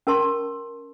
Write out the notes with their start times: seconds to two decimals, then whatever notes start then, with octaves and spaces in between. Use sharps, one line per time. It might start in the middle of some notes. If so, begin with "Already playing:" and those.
0.07 C#4 A#4 A5 C6 C#6